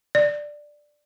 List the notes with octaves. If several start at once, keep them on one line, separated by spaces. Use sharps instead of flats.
D5